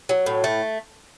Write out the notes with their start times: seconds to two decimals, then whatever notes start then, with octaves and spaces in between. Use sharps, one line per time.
0.09 F#3
0.26 A2
0.44 A3